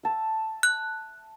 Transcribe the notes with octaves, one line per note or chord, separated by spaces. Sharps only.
E5 A5
F#6